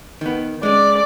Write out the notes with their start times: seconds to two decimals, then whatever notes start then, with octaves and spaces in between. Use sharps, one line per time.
0.21 D#3 B3
0.63 G#3 C#4 D5